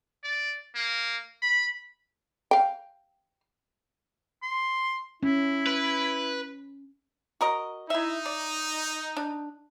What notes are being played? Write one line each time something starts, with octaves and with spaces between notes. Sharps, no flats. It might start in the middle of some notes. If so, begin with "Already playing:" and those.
D5
A#3
B5
F5 G5
C6
C#4 E4
B4
F#4 A#4 D#5
D#4 E4 E5
D5
D4